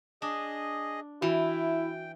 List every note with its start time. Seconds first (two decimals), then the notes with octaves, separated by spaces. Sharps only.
0.22 D4 G#4 D#5
1.22 E3 E4 F#4 G5